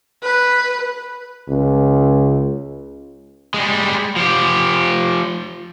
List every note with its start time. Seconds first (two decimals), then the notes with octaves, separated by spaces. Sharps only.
0.23 B4
1.49 C#2
3.54 G3 G#3
4.16 F3 G4